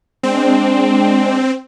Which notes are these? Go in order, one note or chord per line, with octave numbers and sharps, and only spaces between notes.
G#3 C4 D4